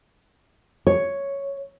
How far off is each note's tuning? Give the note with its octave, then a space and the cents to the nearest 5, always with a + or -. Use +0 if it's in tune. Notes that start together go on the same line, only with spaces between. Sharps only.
C#5 +0